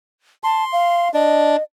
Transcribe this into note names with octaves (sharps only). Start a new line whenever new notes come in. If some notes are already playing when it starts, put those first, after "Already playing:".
A5 C6
F5
D4 D#5